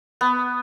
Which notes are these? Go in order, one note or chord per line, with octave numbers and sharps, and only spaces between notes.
B3